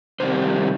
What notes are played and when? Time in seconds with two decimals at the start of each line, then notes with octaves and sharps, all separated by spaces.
0.20 C3 D#3 G3 C4 C5